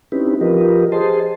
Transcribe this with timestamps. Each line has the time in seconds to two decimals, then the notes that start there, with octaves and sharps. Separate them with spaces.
0.12 C4 C#4 D#4 E4 G4 B4
0.41 F3 F4 G4 A#4 B4 D#5
0.92 G4 G#4 C5 D#5 A5 C6